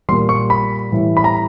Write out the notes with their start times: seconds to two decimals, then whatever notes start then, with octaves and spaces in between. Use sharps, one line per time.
0.09 A#2 G3 C6
0.29 C#6
0.50 B5
0.92 A2 E3 G3
1.17 B5
1.24 A#5